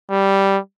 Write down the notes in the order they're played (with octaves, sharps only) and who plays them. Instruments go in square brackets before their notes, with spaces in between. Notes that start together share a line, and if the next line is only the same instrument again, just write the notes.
[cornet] G3